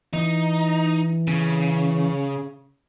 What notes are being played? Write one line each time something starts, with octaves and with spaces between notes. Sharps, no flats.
E3 D#4
C#3